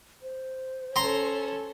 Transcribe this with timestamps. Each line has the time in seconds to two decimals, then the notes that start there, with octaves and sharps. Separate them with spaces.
0.22 C5
0.96 C#4 A4 A#5 C6